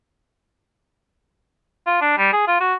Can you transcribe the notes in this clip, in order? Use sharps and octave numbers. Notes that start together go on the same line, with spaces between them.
F4
D4
G3
G#4
F4
F#4